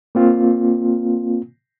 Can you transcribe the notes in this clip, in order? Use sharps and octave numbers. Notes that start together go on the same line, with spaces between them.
A#3 C4 F4